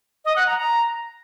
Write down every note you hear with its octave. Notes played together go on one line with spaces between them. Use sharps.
D#5
F#5
A#5
A#5